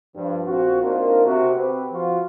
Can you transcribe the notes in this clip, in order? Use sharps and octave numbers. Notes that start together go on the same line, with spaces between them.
G2 F3
A#1 C4 F4 F#4
A#3 C4 D4 D#4 F4 A#4
C3 F#4
C4 G4 B4
F3 F4 F#4